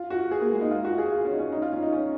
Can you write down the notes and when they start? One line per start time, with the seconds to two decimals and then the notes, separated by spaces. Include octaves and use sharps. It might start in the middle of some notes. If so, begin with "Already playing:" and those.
Already playing: F4
0.10 F#4
0.31 G#4
0.41 A#3
0.51 G#3
0.61 D#4
0.71 F4
0.85 F#4
0.98 G#4
1.12 F4
1.25 C#4
1.33 D#4
1.39 C#4
1.52 D#4
1.62 F4
1.72 C#4
1.83 D#4
1.92 C#4